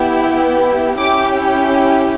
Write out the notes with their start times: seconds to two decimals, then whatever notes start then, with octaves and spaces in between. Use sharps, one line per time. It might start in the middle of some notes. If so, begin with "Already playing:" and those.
Already playing: B3 E4 G4
0.97 C#4 E4 G4 D6